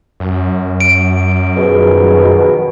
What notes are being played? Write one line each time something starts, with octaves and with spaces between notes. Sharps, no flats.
F#2
D7
B2 D#3 F3 G#4